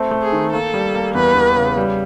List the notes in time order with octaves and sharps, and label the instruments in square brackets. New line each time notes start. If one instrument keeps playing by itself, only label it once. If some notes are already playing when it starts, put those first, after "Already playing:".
Already playing: [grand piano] A3 C4
A3
[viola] G#4
[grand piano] D#3
[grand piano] A#3 [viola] A4
[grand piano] G3
A#3
[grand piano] E2 [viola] B4
[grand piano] E2
C#3
G3